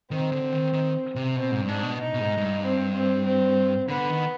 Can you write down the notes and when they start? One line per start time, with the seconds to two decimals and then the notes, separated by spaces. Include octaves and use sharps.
0.11 D#3 C4
0.32 D3
0.53 D#3
0.73 D#3
1.15 C3
1.36 B2 C4
1.52 G#2
1.61 G2
1.68 G#2 D4
1.83 B2
1.99 D#4
2.14 B2
2.20 G#2
2.37 G#2
2.41 G2
2.62 C4
2.93 C4
3.25 C4
3.88 D3 B3
4.09 D#3